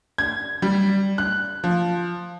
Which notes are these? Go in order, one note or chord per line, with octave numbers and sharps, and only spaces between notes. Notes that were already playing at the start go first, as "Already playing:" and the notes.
G#6
G3
F#6
F3